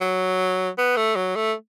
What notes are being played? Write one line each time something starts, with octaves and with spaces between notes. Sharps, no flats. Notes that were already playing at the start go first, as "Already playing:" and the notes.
F#3
B3
A3
F#3
A3